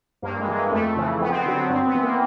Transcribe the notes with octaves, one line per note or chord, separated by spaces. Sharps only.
G2 A#3
G#3
E3
G#3
F2 A3
C#3 E3
F2 B3
C4
B3
D3 F#3 C4
B3
G2 C4
B3
E3
A#3